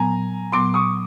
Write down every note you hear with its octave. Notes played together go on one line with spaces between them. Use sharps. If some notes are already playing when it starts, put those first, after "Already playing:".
Already playing: A#2 F#3 B3 G#5 A#5
A#2 F#3 B3 C6 D6
C#6 D#6